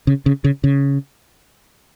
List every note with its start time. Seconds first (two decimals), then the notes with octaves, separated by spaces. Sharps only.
0.07 C#3
0.26 C#3
0.44 C#3
0.64 C#3